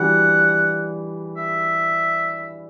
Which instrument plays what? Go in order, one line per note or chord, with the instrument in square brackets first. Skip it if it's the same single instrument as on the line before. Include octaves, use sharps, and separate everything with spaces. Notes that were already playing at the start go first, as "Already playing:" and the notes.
Already playing: [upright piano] E3 G3 D4 F#4 [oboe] F#5
[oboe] E5